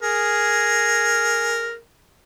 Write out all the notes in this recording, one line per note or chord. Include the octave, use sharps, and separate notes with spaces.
G#4 A#4